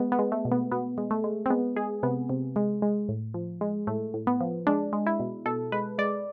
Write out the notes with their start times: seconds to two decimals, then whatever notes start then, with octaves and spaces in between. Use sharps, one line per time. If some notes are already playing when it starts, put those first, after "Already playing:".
Already playing: G#3 B3
0.12 B3
0.19 G#3
0.32 A3
0.45 B2
0.52 B3
0.72 B2 B3
0.98 G#3
1.11 A3
1.24 G#3
1.46 C4
1.50 G#3 B3
1.76 G#3 G#4
2.03 C3 B3
2.29 C3
2.56 G#3
2.82 G#3
3.09 A2
3.34 F3
3.61 G#3
3.87 A2 A3
4.14 A2
4.27 B3
4.41 F3
4.67 G#3 D4
4.93 G#3
5.06 E4
5.20 B2
5.46 B2 A4
5.72 G#3 B4
5.98 G#3 D5